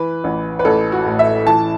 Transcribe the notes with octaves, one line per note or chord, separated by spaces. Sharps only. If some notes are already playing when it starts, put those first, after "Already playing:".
Already playing: E3 B4
A1
B4
A1 A4
F#4
A2
E5
E3 A5